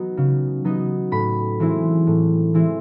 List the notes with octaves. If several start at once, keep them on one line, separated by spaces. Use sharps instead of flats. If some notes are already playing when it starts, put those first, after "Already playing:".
Already playing: F#3 B3 D#4
C#3
F#3 B3 D#4
A2 B5
E3 G#3 C4 E4
A2
E3 G#3 C4 E4